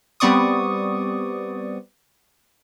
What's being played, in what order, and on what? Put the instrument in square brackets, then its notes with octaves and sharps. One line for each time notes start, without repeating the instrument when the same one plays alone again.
[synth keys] G3 B3 C4 D5 C#6 D#6